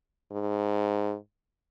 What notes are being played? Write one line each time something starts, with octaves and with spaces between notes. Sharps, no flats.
G#2